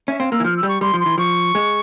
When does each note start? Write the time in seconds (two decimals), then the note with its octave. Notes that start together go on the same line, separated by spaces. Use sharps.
0.08 C#4 E5
0.20 C4 F5
0.32 A#3 E6
0.40 E3
0.44 F3 F6
0.57 E6
0.63 G3
0.69 C#6
0.81 G3 C6
0.94 F3
1.00 C6
1.06 E3
1.18 F3 C#6
1.55 G#3